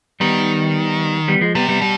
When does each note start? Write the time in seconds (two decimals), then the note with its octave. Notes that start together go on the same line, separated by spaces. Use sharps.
0.20 D#3 G3 B3
1.28 G3 B3
1.41 F3 G#3
1.55 C3 G3 B3
1.69 G3 B3
1.81 B2 G3